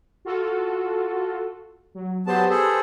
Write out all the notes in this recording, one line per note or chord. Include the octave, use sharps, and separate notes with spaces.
F4 F#4 A4
F#3
F#3 B3 G4 B4 C5 A5
G#4 A4